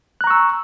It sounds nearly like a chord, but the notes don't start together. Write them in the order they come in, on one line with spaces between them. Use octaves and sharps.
F#6 A#5 C#6 E6